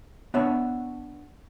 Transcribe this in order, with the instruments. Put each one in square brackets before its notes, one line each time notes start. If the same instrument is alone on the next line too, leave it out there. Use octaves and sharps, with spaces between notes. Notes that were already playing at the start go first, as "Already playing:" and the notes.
[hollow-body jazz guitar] B3 D4 C#5 E5